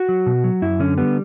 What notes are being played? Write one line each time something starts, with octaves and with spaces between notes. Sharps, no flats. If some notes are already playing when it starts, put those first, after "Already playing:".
Already playing: F#4
F#3
B2
F#3
F#2 E4
D3 C#4
G3 B3